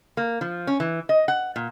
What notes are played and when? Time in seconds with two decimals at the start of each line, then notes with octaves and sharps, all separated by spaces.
0.17 A#3
0.41 F3
0.67 C#4
0.80 E3
1.09 D#5
1.28 F#5
1.56 A#2